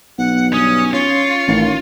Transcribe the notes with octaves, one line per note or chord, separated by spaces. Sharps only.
B1 B3 F#5
G2 C#4 D#6
C#4 F4 C#5
A1 D#3